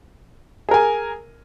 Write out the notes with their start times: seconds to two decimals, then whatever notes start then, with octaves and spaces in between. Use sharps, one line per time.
0.69 G#4
0.71 A#4
0.74 G#5